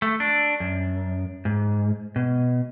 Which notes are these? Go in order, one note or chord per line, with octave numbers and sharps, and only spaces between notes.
A3
D4
F#2
G#2
B2